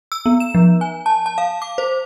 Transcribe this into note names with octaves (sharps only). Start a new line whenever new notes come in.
E6
B3
E7
F3
G#5
A5
A5
F5
D6
C5